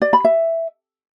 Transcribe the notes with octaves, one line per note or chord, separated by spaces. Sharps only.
D5
B5
E5